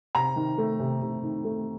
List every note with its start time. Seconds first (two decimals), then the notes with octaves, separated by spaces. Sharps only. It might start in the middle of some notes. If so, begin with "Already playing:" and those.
0.15 C3 A#5
0.36 D#3
0.58 A3
0.80 C3
1.01 C3
1.23 D#3
1.45 A3